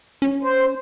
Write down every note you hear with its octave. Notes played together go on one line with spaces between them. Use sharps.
C#4
C5